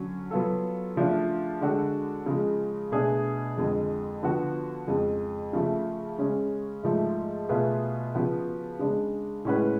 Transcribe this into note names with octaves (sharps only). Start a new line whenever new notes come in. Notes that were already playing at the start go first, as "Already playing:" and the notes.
Already playing: D3 F#3 C#4
F#3 B3 F4 A4
C#3 F3 A3 D4 F4
D3 G#3 D4 F#4 A4
C#3 F3 G#3
B2 A3 D4 G#4
F2 D3 G#3
D3 F3 B3 F#4
F2 C#3 G#3
C#3 F3 A3
C#3 G#3 C#4
G#2 F3 A3
B2 A3 F4 G#4 B4
C#3 F3 B3 F#4 B4
C#3 G#3 D4
A2 G#3 C#4 F#4 B4